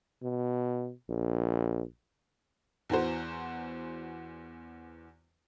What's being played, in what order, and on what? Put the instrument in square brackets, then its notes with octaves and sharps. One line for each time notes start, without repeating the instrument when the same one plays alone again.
[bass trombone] B2
A#1
[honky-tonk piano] E2 E3 F#4 C5